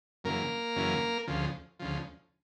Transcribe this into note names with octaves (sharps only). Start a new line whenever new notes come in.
F#2 C#3 E3 A#3 A#4
F#2 C#3 E3
D2 C#3 F3
D2 C#3 F3